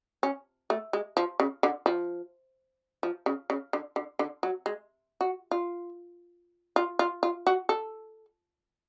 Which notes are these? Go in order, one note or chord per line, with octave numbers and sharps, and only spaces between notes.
C#4
A3
G#3
F3
C#3
D3
F3
F3
C#3
C#3
D3
D3
D3
F#3
G#3
F#4
F4
F4
F4
F4
F#4
A4